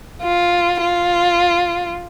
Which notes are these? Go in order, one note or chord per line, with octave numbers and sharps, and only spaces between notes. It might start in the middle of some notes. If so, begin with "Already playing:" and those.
F4
F4